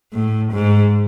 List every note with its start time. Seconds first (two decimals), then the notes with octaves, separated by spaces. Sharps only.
0.13 A2
0.52 G#2